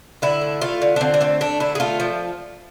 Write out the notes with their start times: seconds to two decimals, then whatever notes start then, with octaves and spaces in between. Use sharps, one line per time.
0.22 D3 E4
0.41 A3
0.61 A3 F4
0.82 D3
0.96 D4
1.01 D3 C4
1.14 D4
1.21 A3 C4
1.41 A3 D4
1.60 D3 E4
1.75 G#4
1.80 A3 F4
2.00 F3